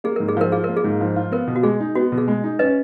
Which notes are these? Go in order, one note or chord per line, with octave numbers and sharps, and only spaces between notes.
A#3 G#4
G#2 A#4
G#4
F3 A#4
F4 G#4
A#3 A#4
G#4
G#2
F3
F4
B3 A#4
B2
F#4
G#3 G#4
D#4
B3 F#4
B2
G#4
G#3
D#4
C#4 B4 D#5